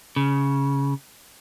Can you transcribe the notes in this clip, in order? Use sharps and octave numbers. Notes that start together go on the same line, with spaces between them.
C#3